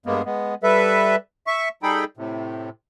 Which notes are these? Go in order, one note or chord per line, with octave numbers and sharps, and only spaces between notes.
G2 G#3 A#3 B3
G#3 B3
G3 A4 B4 E5
E5 C#6
G3 D#4 G#4 A4 G5 B5
A2 C3